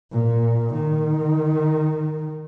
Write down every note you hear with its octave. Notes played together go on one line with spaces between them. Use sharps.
A#2
D#3